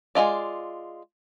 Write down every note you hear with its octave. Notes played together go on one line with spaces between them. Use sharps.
G#3 A3 F4 D5